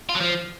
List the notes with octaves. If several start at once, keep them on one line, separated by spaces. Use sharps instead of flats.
F4
F#3
F3